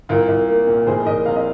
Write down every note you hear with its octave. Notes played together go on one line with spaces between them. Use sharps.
C2 F4 A#4
C2
A#3
A#2
F1 G#4 C5
F1 A#4 D#5
C3 F5
D#5